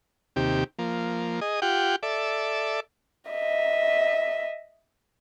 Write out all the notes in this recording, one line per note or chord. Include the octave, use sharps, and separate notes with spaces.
D#2 C3 G4
F3 A#3
G#4 D#5
F4 G4 F#5 G5
A4 D5 E5
D#5 E5